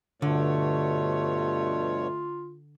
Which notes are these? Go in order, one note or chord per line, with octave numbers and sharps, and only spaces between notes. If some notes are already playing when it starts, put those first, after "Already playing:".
G2 B2 D3 A3 F4 C#5